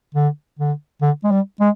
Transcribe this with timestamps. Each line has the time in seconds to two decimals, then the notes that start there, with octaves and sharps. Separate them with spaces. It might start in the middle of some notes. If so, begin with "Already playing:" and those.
0.15 D3
0.59 D3
1.02 D3
1.24 G#3
1.31 G3
1.60 G#3